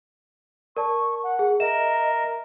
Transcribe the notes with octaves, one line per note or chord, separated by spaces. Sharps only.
A#4 D5 A5 C#6
F#5
G#4
A#4 D#5 E5 E7